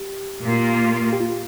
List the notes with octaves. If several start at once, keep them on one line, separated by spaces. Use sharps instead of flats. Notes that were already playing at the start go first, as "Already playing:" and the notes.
Already playing: G4
A#2 A#3 F4
G4
F4